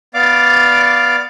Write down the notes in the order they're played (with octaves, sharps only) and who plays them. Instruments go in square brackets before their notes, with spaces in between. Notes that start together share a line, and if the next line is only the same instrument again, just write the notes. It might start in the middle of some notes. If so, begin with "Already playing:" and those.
[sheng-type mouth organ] B3 D5 F5 D6